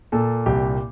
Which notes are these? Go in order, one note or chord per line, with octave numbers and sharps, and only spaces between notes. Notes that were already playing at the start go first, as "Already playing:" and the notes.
A#2 A4
C2 G4